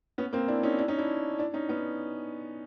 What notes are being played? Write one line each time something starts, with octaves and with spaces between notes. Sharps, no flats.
B3 C#4
A#3 C4
D4 E4
C#4 D#4
D4 E4
C#4 D#4
D4 E4
D4 E4
C#4 D#4
B3 C#4